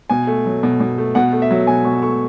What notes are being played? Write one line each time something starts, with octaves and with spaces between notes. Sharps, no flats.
B2 G#5
A3
F#3
B2
B2
A3
B2 F#5
A3
E5
F#3
B2 G#5
B2 C#6
A3 C#6